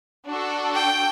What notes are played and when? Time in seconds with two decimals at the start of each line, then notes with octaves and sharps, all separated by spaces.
0.28 D4 F#4 A4
0.75 G5